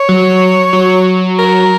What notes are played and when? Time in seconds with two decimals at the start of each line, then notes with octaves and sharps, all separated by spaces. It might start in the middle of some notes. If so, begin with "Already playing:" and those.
Already playing: C#5
0.09 F#3
0.73 F#3
1.39 A#4